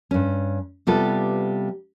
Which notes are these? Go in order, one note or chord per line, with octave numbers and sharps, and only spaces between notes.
G2 C#4
C3 G3 B3 F4 A4